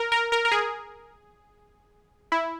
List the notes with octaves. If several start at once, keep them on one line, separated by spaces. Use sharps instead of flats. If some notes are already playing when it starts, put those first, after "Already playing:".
Already playing: A#4
A#4
A#4
A#4
G#4
E4